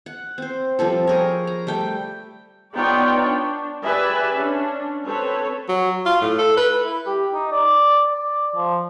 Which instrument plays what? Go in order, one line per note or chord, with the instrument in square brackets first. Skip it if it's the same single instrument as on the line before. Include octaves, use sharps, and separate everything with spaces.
[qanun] F#5
C4 C5
F3 G3 C4 A4
G#4 A#4 C#5
A#5
G3 A3 G5
[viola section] B3 D#4 F4 C#5 D5 G5
D4
G4 G#4 B4 D5 E5 G#5
C#4 D4
C4 A4 B4 C#5
[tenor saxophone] F#3
F4
A2
A4
B4
[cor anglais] E4
G4
D#4
D5
D5
F3